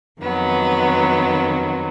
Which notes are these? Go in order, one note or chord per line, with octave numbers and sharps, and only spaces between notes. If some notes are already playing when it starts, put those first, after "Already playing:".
F2 D#3 F#3 B3